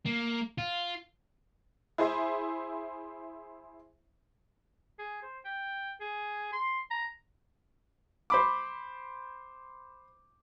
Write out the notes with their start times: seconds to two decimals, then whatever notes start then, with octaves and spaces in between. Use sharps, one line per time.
0.06 A#3
0.58 F4
1.98 E4 G#4 C5 E5
4.99 G#4
5.23 C5
5.45 G5
6.01 G#4
6.52 C6
6.91 A#5
8.30 C5 B5 D6